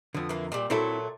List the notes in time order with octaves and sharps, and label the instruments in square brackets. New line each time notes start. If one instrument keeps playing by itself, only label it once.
[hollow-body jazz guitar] F2 D3 [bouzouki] B3
[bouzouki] E3 A#3
A#2 G3
[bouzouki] A#2 F#3 A3 [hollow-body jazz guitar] C4 E4 A4